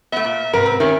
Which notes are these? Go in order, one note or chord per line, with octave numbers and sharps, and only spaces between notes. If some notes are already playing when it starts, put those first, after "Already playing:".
A3 B3 E5
A#2
G#2 C3 A#4 B4
C4
D#3 C#4 A#4 E5